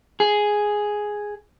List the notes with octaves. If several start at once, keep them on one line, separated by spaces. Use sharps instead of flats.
G#4